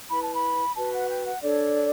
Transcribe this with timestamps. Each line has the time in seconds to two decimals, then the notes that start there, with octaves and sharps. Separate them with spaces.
0.09 E4 B4 B5
0.23 A5
0.35 B5
0.76 F#4 B4 A5
0.93 F#5
1.09 G5
1.26 F#5
1.43 D4 A4 C#5 D5